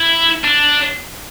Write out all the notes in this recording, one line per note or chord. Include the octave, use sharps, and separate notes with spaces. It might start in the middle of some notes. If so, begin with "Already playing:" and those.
Already playing: E4
D4